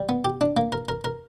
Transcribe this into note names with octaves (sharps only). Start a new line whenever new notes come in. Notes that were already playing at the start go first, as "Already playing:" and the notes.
Already playing: G3
B3
G4
D4
A#3
A#4
A#4
A#4